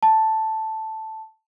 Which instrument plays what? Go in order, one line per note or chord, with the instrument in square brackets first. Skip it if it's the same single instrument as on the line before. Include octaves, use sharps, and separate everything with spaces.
[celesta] A5